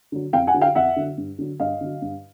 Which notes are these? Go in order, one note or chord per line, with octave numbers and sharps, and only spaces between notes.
D3 F#3
F2 F5 G5
F#5 G#5
D3 F#3
F5 G5
F2 E5 F#5
D3 F#3
G2
D3 F#3
G2 D#5 F5
D3 F#3
G2